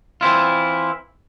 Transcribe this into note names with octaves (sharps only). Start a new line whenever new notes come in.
E3 C4 E4 F4